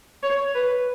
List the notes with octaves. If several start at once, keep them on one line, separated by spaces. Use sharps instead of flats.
C#5
B4